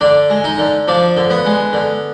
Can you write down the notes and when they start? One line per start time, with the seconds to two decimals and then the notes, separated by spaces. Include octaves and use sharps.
0.01 D3 D4
0.30 G#3
0.44 D#4
0.58 D3
0.88 F3 D4
1.17 D3
1.30 B3
1.46 G#3
1.73 D3